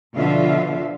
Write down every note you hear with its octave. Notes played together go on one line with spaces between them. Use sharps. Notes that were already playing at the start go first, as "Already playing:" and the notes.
B2 D3 F3 F4 E5 F5